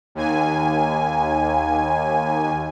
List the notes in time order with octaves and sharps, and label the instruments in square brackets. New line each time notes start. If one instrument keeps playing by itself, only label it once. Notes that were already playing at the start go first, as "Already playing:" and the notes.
[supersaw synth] D#2 G#5